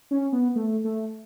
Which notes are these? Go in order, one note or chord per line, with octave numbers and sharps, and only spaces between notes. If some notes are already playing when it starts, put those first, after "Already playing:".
C#4
B3
A3
A3